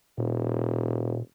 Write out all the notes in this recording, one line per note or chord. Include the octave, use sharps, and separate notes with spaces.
E1 A#2